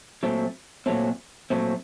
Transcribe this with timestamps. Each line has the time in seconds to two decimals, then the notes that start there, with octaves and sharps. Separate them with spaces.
0.23 A#2 F#3 A3 C4
0.86 A#2 F#3 A3 C4
1.50 A#2 F#3 A3 C4